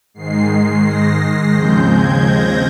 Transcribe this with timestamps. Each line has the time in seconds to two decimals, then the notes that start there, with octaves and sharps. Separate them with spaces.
0.14 G#2 D#3 G#3 C7
0.84 A#6
1.55 D#2 C#3 F3 G#3 C4 G6
1.89 G#6
2.24 A#6